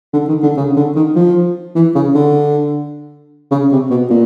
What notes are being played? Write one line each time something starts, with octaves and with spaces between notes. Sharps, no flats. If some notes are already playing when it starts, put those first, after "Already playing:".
D3
D#3
D3
C#3
D3
D#3
F3
E3
C#3
D3
C#3
C3
B2
A#2